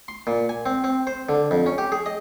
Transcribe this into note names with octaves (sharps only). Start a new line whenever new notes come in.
C6
A#2
G#5
C4
C4
C5
D3
F2
C#4
G4
G#4
D#5